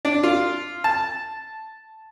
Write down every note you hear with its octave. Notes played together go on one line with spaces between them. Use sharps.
D4
F4
A5